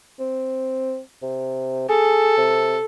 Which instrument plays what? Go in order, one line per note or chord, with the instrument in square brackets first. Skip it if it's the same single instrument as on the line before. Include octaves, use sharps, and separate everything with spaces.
[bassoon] C4
C3
[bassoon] G#4 [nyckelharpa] A4
[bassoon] C3